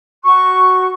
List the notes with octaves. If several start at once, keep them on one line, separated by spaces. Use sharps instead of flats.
F#4 C#6